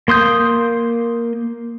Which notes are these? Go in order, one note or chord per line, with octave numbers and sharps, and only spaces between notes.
A#3 C6 D#6 G6